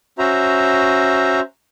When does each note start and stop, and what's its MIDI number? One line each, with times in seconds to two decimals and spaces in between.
0.19 1.40 61
0.19 1.40 66
0.19 1.40 72
0.19 1.40 76
0.19 1.40 82